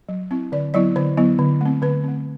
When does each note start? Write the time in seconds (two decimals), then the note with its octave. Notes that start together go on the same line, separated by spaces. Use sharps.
0.09 F#3
0.31 C4 E4
0.52 D3 D5
0.74 F#3 B3 E4 D5
0.96 D3 C5
1.17 F#3 B3 E4
1.39 D3
1.61 A3 C4
1.82 D3 B4
2.04 A3 C4